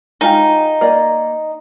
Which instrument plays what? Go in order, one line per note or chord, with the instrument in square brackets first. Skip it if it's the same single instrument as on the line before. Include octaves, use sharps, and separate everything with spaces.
[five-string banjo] G#3 F4 G4 [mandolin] D#4
[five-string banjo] A#3 D5 D#5